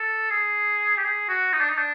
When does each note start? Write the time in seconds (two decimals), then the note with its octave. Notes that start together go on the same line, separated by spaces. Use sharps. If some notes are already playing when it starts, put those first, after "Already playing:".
Already playing: A4
0.30 G#4
0.97 G4
1.04 G#4
1.29 F#4
1.53 D#4
1.60 D4
1.69 D#4
1.78 D4